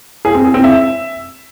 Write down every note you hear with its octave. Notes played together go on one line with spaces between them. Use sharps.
G#4
C4
G#4
C4
E5